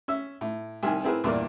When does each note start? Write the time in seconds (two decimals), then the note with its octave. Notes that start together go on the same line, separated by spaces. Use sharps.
0.08 C#4 E5
0.41 A2
0.83 C2 D#3 G#5
1.04 C4 E4 G#4 A#4 B4
1.24 E2 G2 A#2 A#3 D4